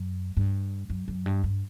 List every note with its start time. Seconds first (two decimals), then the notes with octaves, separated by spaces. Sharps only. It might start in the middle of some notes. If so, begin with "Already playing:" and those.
Already playing: F#2
0.37 G2
0.90 F#2
1.08 F#2
1.26 G2
1.44 G2